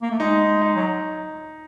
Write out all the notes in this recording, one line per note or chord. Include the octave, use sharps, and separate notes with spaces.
A#3
A3
G#3 D#4
D#4
F#3